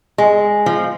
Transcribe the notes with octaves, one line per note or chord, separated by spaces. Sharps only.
G#3
F3